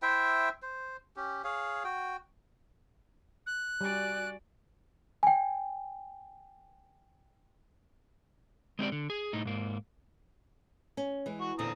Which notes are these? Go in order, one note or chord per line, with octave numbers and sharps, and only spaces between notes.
E4 C5 E5 G5
C5
C#4 G4
G#4 C#5 F5
F#4 G5
F#6
G3 F#4 D5 G#5
G5 G#5
G#3 C4 G4 D5
D3
G#4
A2 D#4
G#2 A#3
C#4
E3 G#3
F#4 C#6
E2 A#2 D3 C4 A#5 D#6